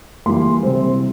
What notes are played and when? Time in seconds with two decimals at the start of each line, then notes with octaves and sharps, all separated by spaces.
0.26 E3 G3 A#3 C6
0.63 C3 G3 C4